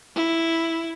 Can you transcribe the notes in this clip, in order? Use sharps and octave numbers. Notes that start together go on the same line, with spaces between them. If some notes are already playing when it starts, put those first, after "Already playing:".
E4